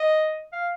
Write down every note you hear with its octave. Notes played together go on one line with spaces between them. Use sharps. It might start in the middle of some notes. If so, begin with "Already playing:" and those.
Already playing: D#5
F5